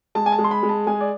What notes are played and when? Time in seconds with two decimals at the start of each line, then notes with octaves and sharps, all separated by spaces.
0.15 G#3 A5
0.26 G#5
0.32 A5
0.39 G#3
0.44 C6
0.51 B5
0.63 G#3
0.69 A5
0.87 G#3 G#5
1.01 D5